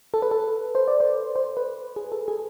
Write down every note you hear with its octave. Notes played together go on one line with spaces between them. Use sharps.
A4
B4
A4
C5
D5
C5
C5
B4
G#4
A4
G#4